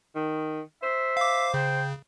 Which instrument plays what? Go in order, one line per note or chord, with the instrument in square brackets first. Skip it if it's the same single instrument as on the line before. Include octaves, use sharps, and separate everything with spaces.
[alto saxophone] D#3
[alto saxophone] C5 [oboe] E5
[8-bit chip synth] F5 D6
[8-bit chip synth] C#3 [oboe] G5